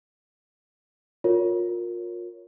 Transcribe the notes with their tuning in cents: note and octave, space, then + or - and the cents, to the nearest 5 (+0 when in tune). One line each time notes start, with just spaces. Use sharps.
F4 +30 A#4 +0 C#5 +0